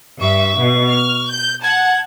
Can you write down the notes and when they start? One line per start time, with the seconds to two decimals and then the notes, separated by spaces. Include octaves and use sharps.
0.21 G2 E5 C#6
0.58 B2
0.90 F6
1.29 G6
1.63 F#5 A5 G#6